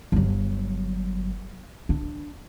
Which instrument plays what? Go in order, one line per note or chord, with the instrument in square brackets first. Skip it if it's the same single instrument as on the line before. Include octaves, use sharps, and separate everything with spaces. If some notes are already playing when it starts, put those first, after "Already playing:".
[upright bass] G1 F#3
D4